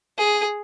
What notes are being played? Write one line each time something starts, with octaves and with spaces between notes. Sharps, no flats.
G#4